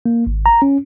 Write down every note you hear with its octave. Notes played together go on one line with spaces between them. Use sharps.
A#3
G#1
A#5
C#4